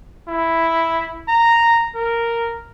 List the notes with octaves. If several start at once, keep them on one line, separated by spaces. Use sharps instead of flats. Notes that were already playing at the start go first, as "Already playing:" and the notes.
E4
A#5
A#4